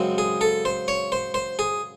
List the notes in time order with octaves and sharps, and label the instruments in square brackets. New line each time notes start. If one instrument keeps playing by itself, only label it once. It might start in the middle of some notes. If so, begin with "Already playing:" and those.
Already playing: [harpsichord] F#2 C#3 G#3 C4
G#4
A4
C5
C#5
C5
C5
G#4